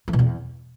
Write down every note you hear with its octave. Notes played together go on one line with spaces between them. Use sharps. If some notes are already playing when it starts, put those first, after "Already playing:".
E3
B2
E2